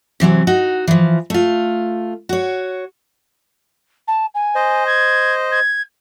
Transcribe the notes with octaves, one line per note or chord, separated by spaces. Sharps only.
C3 E3 F#3 C4
D#4 F#4
E3 F3
A3 F4
F#4 C#5
A5
G#5
C5 D#5
G#6
G#6